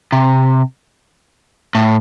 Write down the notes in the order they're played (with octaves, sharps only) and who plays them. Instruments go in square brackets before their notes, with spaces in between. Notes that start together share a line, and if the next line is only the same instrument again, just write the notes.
[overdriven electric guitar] C3
A2